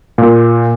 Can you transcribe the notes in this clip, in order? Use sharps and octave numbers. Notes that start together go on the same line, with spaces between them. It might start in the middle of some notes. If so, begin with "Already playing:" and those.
A#2